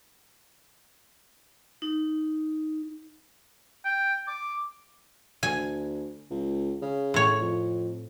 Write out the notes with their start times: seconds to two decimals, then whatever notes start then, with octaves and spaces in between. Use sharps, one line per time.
1.82 D#4
3.85 G5
4.27 D6
5.43 D2 G#5
6.30 C#2
6.82 C#3
7.14 A2 C#5
7.40 F2